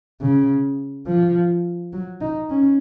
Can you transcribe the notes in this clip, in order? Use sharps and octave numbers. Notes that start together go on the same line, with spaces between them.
C#3
F3
F#3
D#4
C#4